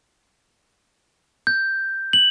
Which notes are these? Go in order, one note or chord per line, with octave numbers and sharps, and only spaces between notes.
G6
F#7